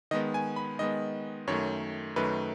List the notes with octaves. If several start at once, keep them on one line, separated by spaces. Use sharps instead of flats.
D#3 G#3 B3 D#5
G#5
B5
D#3 G#3 B3 D#5
F#2 D#3 A3 C#5
F#2 D#3 A3 B4